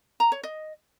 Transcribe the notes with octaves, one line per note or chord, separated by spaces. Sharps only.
A#5
C#5
D#5